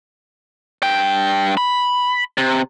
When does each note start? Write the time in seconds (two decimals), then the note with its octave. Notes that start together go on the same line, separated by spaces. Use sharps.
0.83 G2 G5
1.57 B5
2.38 C3